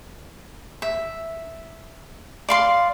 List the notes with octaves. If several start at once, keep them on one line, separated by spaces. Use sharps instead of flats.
E5
D5 F5 C6